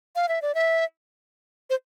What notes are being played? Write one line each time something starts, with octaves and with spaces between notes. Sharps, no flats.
F5
E5
D5
E5
C5